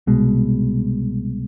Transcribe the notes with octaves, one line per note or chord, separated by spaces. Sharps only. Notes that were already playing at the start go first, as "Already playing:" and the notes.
C2 B2 G#3